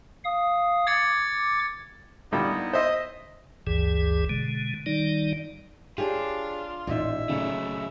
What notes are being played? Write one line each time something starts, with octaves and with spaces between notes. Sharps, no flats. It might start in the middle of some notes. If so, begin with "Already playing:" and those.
F5 D#6
D6 G#6 A6 C#7
A#2 D3 G3 B3 D#4 E4
C5 D#5 E5
G1 D2 G2 E3 G#4
B2 D3 G#3
D#3 G3 D#4 D5
D4 F4 G4 G#4 C#5
A1 A#2 D#4 E5
C#3 F#3 A3